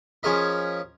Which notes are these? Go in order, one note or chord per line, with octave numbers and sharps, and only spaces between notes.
F3 C#4 G#4 A#4 D#5 B5